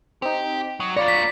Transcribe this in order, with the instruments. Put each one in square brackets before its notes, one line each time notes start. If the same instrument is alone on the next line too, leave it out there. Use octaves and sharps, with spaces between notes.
[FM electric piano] C4 D#4 [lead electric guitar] G4
[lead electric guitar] F#3 [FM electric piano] D#6
[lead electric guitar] A#3 C#5 [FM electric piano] F4 B5 A#6 [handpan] D5
[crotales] B6